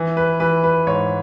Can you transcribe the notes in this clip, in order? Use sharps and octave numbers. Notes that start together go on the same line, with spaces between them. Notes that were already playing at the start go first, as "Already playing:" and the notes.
Already playing: E3
B4
E3 B4
B4
G#2 C#5